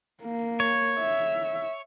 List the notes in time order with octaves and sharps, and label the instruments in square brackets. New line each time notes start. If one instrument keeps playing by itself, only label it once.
[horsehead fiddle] A#3
[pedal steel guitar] C#5
[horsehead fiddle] E5